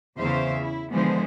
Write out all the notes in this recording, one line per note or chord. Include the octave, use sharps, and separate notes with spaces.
E2 C#3 C5 E5 F5
E4
D3 E3 F3 G#3 B3 C5